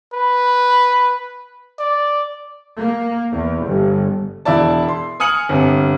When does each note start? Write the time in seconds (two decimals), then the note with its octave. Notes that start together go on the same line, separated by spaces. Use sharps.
0.13 B4
1.79 D5
2.79 A#3
3.33 E2
3.65 G1
4.45 E1 E2 E4 D5 A5
4.88 C6
5.20 G#5 D#6 F6 C#7 F#7
5.49 G1 C3